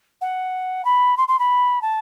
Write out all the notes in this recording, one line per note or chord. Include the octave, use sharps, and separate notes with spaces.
F#5
B5
C6
C6
B5
A5